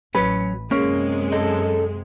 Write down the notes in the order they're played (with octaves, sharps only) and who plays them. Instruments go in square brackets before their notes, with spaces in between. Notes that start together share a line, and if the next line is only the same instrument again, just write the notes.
[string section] A1 [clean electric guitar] F#3 C#4 [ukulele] B4
[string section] F#2 C3 G#3 [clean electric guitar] A#3 [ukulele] C#4
[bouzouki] D#4 A4